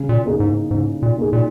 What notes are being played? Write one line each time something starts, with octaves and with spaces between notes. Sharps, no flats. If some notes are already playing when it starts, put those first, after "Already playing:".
Already playing: C#3
A#2
A#3 D#4 G#4
G#2
G#2 C#3
A#2
A#3 D#4 G#4
A#2